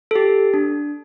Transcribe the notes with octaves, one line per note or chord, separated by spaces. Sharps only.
A4
G4
D4